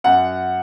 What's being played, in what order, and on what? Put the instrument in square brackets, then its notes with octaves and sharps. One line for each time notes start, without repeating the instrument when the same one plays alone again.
[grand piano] F#2 F#5